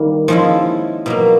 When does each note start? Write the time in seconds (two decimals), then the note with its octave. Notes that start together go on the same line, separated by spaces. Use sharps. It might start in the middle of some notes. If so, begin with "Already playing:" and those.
Already playing: D#3 G3 A#3
0.28 F3 G#3 C#4 E4
1.06 B2 F#3 A#3